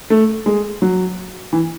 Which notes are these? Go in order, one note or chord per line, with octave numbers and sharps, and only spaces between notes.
A3
G#3
F#3
E3